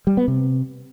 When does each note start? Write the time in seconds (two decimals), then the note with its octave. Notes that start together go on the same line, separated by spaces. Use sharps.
0.07 G3
0.17 B3
0.28 C3